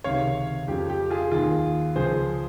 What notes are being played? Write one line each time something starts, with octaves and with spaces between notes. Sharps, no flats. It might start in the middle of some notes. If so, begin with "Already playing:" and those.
C#2 C3 D#3 C#5 F5
F2 C#3 F3 G4
G4
F4 G#4
D#2 D#3 F4 G#4
C#2 C#3 F3 G#4 C5